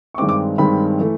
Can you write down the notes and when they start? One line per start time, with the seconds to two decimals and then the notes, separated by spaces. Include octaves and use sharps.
0.14 C#6
0.18 G2 D#3 G#3 C4 D6
0.29 D6
0.58 G2 D#3 G#3 C4 B5
0.99 E3 A3